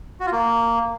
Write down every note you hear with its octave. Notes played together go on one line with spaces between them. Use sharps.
F#4
F4
A#3